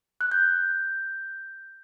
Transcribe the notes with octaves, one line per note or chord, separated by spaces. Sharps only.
F#6
G6